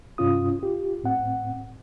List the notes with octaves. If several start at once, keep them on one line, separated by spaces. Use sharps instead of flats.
G2 C3 C#4 F4 D#6
F4 G4
A2 C4 F#5